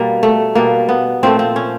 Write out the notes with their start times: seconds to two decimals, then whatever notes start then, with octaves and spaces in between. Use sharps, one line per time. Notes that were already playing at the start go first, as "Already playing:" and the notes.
Already playing: B2 G3 A#3
0.23 A3
0.55 B2 G3 A#3
0.89 B3
1.23 A#2 F3 A3 C4
1.39 C4
1.56 C#4